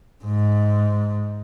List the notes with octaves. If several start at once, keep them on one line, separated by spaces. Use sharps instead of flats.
G#2